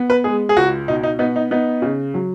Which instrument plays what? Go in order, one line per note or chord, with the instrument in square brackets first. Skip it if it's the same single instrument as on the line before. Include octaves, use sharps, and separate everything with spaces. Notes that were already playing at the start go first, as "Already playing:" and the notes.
Already playing: [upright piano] B3
[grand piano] B4
[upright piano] G#3 [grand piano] G#4
[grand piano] G#4
[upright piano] C#2 [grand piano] F#4
[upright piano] B2 [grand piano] D#4
[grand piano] D#4
[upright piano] B3 [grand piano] D#4
[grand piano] D#4
[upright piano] B3 [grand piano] D#4
[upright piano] C#3
F#3